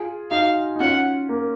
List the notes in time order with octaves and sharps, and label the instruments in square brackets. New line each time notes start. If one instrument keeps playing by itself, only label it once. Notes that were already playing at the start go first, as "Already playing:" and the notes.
Already playing: [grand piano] F4 G#4
[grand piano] D#4 F#4 [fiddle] F5
[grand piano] D#4
[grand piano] C#4 F4 [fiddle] F#5
[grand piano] A#3